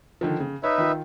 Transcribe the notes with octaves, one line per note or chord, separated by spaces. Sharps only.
D3 D#3 F3
C#3
D#4 B4 C#5 E5
D#3 F4